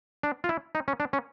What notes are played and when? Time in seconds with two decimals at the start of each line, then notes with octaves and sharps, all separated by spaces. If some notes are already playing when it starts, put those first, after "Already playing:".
0.23 D4
0.44 F4
0.49 E4
0.75 D#4
0.88 C#4
1.00 D4
1.13 C#4